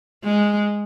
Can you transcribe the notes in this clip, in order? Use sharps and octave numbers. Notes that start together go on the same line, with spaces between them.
G#3